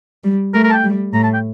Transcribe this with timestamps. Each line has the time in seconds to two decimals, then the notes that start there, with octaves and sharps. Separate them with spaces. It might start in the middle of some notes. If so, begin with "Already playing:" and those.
0.24 G3
0.54 A3 A#4
0.64 A#4
0.70 A5
0.73 G5
0.84 G3
1.13 A2 A#5
1.23 A5
1.34 G5